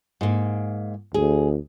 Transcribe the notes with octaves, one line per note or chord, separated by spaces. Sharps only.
G#2 A#3
D2 G#4